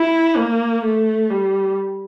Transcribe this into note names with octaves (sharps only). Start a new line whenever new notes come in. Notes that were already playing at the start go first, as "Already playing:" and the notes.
Already playing: E4
A#3
A3
G3